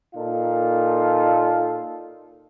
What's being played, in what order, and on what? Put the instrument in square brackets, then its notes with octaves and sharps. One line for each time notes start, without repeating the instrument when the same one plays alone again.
[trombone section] A#2 D#4 F4 A4